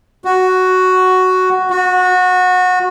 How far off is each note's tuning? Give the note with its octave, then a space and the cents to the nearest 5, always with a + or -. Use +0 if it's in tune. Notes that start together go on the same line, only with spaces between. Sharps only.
F#4 +5
F#4 -20